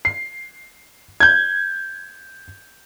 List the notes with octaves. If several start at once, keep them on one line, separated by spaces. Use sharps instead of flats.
C7
G6 G#6